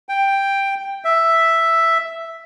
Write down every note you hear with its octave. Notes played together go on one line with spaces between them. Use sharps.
G5
E5